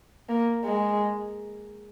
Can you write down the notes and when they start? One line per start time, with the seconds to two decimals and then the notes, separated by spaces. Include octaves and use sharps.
0.29 A#3
0.65 G#3